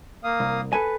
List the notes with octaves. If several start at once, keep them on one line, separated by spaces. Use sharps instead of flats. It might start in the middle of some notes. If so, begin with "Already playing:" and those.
A#3 F5 D#6
C2
A4 B4 G#5